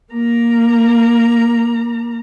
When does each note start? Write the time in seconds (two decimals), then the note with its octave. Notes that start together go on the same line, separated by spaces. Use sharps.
0.12 A#3 A#5